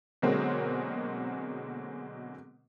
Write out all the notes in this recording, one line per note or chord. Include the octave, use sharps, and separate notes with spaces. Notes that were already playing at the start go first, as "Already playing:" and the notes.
B2 D3 F#3 G#3 A#3 C4